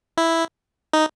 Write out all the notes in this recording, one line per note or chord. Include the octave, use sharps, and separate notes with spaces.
E4
D#4